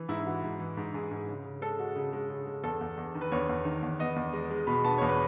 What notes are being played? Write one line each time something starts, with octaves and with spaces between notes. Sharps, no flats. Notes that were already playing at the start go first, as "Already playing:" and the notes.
Already playing: E3
G#2 E4
E4
E3 F#4
G#2
E3
G#2
G#2 G#4
G#2
C#3
C#3
G#3 A4
G#3 F#4
C#3
G#3
C#3
G#3
E2 A4
E2
E2
D#3
B4
E2 C#5
E2
D#3
E2
B3 D#5
E2
G#3
G#3
B2 B5
B3 A5
E2 C#5
B4